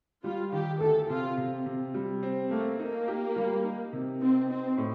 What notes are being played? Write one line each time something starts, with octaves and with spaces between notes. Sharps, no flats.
G3 F4
D#3 G4
D2 A4
C3 F4
C3
C3
G3
C4
A3 A#3
A#3 D#4
G4
G3
D#4
C3
C4 D#4
C4 D#4
A2